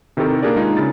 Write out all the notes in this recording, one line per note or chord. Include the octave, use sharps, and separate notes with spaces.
C3 D#3 E4 G4 A4 A#4
A#3 D4 G4 G#4 A#4 D5
G#3 D#4 F4
C#3 E4 A6